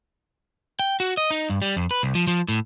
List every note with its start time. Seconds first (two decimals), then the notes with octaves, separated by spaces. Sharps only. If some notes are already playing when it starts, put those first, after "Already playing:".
0.79 G5
1.00 F#4
1.17 D#5
1.31 D#4
1.50 G2
1.62 G3
1.76 F2
1.91 B4
2.03 C2
2.15 F3
2.27 F3
2.48 A2